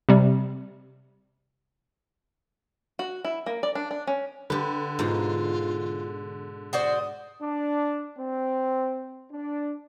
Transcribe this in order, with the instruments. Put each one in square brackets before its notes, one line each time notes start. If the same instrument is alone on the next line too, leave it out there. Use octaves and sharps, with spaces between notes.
[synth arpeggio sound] C3 G3
[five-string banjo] F#4
E4
A#3
D5
D4
D4
C#4
[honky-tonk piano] D3 [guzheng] G4 B4
[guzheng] G#2 B2 [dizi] F4
[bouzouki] F#4 C5 D5 [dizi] D#6
[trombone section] D4
C4
D4